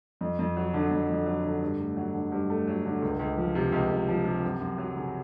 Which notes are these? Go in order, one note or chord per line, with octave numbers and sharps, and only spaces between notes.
F2
F2
F#3
D3
F2
F2
F#3
D3
G2
A3
F#3
D3
G2
A3
F#3
D3
C#2
C#2
F3
C3
C#2
C#2
F3
C3
F#2
F#2
F#3
C#3